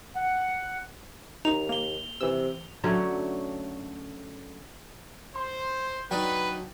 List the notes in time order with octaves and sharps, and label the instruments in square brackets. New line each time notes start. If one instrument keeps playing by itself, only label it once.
[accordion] F#5
[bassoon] D#2 [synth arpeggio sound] D#4 [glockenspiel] F7
[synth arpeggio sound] A#3 [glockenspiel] F7 G7
[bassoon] C3 [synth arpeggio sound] E3 E6
[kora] D3 F#3 A3 C#4
[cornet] C5 [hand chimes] C6
[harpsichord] F#3 D4 D#4 [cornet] B4 [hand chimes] G5